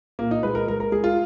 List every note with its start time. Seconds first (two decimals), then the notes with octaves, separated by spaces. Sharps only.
0.19 A#2 A#3
0.31 D#4
0.43 G#3 B4
0.55 A#4
0.68 G#3 A#4
0.80 A#4
0.92 G#3 G#4
1.04 F4